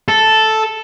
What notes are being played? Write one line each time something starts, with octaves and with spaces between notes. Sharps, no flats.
A4